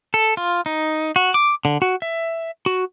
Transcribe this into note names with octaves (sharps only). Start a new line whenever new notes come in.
A4
F4
D#4
F#4
D6
D3
F#4
E5
F#4